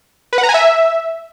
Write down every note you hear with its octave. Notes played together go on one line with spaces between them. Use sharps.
B4
F#5
A#5
G#5
E5